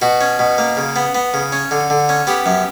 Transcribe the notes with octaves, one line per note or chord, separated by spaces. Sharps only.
B2 F#4
C#4
B2
A#3
C#3
B3
B3
C#3
C#4
D3
D3
C#4
B3 G4
F#2